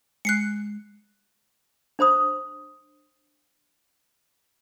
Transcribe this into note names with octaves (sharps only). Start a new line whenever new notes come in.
G#3 F#6 C7 C#7
D4 C5 B5 D#6